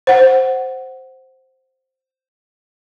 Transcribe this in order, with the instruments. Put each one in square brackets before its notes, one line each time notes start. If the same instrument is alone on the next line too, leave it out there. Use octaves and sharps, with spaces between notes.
[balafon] C5 F#5